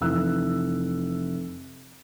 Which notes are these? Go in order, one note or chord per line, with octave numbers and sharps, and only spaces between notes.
F1 E3 E6 F#6